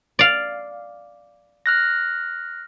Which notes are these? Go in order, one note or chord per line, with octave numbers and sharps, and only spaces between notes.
D5 F5
F6 F#6 A#6